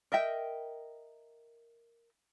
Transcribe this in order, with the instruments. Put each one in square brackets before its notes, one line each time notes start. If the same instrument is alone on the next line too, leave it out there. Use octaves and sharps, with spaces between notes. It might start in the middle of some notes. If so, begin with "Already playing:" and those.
[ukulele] A#4 D#5 E5 G5